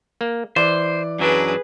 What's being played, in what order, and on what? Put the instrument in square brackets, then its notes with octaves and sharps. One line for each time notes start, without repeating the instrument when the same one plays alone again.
[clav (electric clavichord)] A#3
[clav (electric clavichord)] E3 [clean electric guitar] C5 [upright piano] D5
[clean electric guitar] F#2 F#3 D4 [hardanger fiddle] G#4 B4